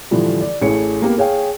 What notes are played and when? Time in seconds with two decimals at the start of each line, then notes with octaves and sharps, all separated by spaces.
0.11 A2 D3 E3 F3 G3
0.41 D5
0.61 A1 A2 A3 G#4 C#5 C#7
1.02 A#3 B3 G4 A#4
1.18 G#4 C#5 F5 G5